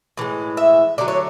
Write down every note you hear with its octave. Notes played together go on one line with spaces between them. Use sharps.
A2 E3 G#3
E5
D3 F#3 A3 D5
C#5